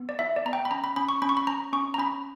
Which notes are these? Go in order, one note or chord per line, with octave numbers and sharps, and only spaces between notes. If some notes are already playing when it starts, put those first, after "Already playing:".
Already playing: B3
D5
E4 E5
D5
B3 A#5
G5
B5
C#4 A#5
B5
C#4 B5
C#6
C#4 B5
C#6
B5
C#4 A#5
C#4 C#6
A#5
C#4 B5